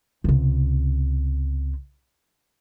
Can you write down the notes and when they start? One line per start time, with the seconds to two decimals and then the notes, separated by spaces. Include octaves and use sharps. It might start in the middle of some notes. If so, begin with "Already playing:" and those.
0.24 C#2 C3